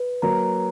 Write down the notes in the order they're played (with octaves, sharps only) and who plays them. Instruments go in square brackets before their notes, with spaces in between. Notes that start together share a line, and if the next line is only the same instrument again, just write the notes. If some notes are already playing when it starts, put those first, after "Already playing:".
Already playing: [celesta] B4
[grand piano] F#3 A#3 [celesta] A#5